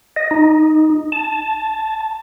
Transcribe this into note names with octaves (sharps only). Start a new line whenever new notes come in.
D#5
D#4
A5